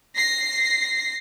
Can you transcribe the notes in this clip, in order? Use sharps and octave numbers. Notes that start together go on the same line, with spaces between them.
A#6 C7